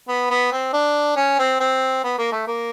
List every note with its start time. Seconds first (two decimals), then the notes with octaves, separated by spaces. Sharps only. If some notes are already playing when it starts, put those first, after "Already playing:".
0.08 B3
0.30 B3
0.52 C4
0.73 D4
1.16 C#4
1.39 C4
1.60 C4
2.04 B3
2.18 A#3
2.32 A3
2.47 A#3